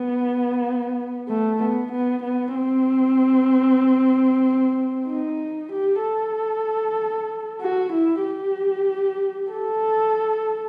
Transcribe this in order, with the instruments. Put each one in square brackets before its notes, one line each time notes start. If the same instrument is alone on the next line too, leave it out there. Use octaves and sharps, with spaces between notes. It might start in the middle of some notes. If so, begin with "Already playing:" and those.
Already playing: [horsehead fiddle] B3
A3
B3
B3
B3
C4
D#4
G4
A4
F#4
E4
G4
A4